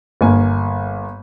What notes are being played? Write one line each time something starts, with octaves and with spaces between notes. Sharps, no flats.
G1 A#3 G#5